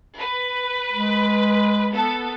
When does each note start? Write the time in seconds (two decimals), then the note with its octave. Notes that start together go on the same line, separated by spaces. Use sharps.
0.17 B4
0.92 G#3
1.93 B3 A4